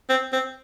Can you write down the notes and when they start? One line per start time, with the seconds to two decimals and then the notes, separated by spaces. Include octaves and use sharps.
0.09 C4
0.33 C4